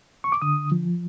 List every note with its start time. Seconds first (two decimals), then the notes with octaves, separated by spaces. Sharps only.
0.24 C#6
0.32 D6
0.42 D3 D#6
0.72 F3